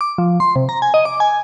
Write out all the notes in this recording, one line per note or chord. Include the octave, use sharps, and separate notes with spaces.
D6
F3
C6
C3
A#5
G#5
D#5
D6
G#5